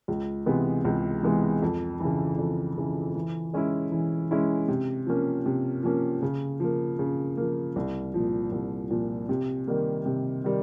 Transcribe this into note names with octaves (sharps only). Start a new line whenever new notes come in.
C#2
C3 E3 G#3 B3
C#2
C3 E3 G#3 B3
F2
C#3 E3
F2
C#3 E3
E3
G#3 C#4 E4
E3
G#3 C#4 E4
C3
F3 A#3 C#4
C3
F3 A#3 C#4
C#3
F3 A#3
C#3
F3 A#3
C2
A#2 F3
C2
A#2 F3
C3
D#3 G3 A#3
C3
D#3 G3